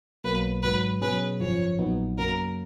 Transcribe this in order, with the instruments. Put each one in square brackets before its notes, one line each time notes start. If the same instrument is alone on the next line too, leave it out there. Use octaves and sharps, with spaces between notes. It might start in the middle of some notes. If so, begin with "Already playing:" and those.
[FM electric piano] B1 B2 F#3 A#3 [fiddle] B4
[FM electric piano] G#1 G#2 F#3 [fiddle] B4
[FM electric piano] B2 F#3 C#4 G#4 [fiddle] B4
[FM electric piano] G#1 F#2 C#3 F3 [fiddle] C#5
[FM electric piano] A#1 A#2 F#3 B3 D#4
[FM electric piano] F#2 C#3 F#3 A#3 [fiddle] A#4